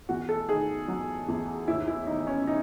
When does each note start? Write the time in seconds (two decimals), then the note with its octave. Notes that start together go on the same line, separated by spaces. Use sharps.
0.09 E2 F#4
0.29 A4
0.49 D#3 G#4
0.88 F#3
1.28 E2
1.67 D#2 E4
1.88 E4
2.07 D#3 D#4
2.27 C#4
2.47 D#4